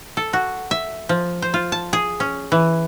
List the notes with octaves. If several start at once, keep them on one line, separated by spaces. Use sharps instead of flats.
A4
F#4
E5
F3
C5
F4
A5
G#4
C#4
E3